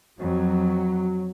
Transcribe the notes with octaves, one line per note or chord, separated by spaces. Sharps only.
F2 F#3